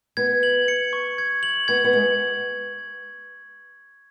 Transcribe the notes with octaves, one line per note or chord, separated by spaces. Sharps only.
B3 G#6
F#7
C#7
C#6
G#6
F#7
B3 G#6
B3
G#3 F#7